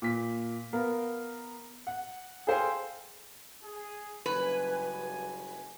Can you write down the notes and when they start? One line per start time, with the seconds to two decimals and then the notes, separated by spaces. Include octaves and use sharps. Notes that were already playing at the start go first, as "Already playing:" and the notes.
0.02 A#2 B6
0.73 B3 A#4 F5
1.87 F#5
2.47 G#4 A4 C5 F5 G5 G#5
3.63 G#4
4.26 F#1 G2 B4 G#5